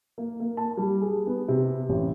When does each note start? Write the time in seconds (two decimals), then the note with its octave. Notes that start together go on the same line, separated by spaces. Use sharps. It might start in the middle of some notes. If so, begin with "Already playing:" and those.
0.18 A#3
0.40 A#3
0.57 A5
0.77 G3
1.02 G#4
1.27 B3
1.48 C3
1.89 A1